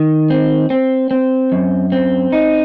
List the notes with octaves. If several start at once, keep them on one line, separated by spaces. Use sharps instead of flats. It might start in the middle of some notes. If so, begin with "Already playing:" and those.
Already playing: D#3
C4
C4
C4
F#2
C4
D#4